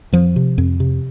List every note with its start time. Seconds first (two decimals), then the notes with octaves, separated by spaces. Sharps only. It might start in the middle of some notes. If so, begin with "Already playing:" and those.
0.12 F2 F3
0.36 C3
0.58 F2
0.80 C3